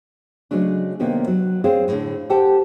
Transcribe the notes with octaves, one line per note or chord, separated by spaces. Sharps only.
C#3 F#3 G#3 A3 D4
C3 D#3 A#3 B3 C#4 D4
F#3
C4 G#4 C5 C#5 F5
A2 D3
G4 A4 C5 F#5 G5 A5